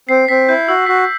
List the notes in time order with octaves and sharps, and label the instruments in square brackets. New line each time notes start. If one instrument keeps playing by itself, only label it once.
[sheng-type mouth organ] C4 [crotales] C7
[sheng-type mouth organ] C4 [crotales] B6
[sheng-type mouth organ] E4 [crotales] G6
[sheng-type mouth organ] F#4 [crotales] E6
[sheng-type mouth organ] F#4 [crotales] B6
[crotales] C7